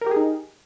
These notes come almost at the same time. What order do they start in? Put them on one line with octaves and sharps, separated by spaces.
A#4 G4 G#4 D#4